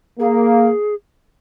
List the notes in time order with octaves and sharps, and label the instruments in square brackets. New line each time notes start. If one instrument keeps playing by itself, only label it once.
[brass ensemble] A#3 [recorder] G#4